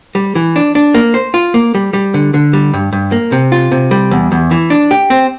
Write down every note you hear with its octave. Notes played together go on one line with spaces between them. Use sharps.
G3
E3
D4
D4
A#3
C5
F4
A#3
G3
G3
D3
D3
G3
G2
G2
A#3
C3
F4
C3
G3
E2
E2
E3
D4
G4
C4